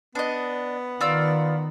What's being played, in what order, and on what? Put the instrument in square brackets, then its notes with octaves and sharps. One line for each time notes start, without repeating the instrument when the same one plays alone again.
[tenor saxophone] B3 [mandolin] D4 D#5
[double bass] D#3 [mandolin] F4 D5 E6